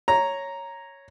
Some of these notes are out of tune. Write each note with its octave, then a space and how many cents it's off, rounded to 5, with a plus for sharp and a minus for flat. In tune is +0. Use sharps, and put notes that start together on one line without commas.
C#5 +0 A#5 +0